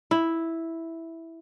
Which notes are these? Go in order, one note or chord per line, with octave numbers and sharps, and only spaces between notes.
E4